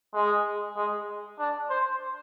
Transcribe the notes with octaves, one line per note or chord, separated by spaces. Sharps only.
G#3
G#3
D4
C5